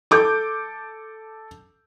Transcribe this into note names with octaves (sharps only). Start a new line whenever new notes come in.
A4 D6 G6